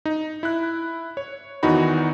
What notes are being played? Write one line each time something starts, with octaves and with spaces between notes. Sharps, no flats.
D#4
E4 F#6
C#5
E2 D#3 E3 D#4 F#4 B5